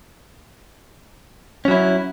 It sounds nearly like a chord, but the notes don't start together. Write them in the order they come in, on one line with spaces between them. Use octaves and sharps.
C#4 F#3 E4